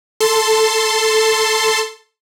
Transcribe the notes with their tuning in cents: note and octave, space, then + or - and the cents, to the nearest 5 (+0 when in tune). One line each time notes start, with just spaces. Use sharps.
A4 +0 A5 +10 C6 +0